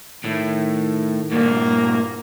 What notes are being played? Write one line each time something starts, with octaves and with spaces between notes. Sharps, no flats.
A2 D#3
G2 A#2 A#3